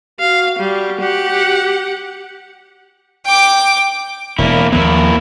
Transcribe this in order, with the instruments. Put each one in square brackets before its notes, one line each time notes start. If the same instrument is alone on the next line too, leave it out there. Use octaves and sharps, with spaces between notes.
[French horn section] F#4 [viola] F5
[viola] G3
G4 F#5
[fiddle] G5 D6
[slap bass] E1 [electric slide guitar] A#3 E4
[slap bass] D#2 F3 B3 [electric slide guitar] A#3 E4